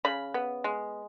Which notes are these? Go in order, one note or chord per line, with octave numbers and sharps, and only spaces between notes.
C#3 B5
B3
G#3